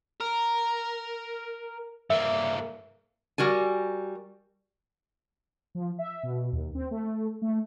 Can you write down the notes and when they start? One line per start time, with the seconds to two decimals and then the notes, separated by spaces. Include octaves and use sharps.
0.21 A#4
2.10 G2 A#3 E5
3.38 G3 F#4 A#4 G#5
5.75 F3
5.99 E5
6.23 B2
6.52 D#2
6.75 C4
6.91 A3
7.42 A3